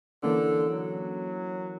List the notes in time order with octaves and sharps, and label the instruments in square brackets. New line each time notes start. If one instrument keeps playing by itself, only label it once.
[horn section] D3 [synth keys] E3 A#3 C#4
[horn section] F#3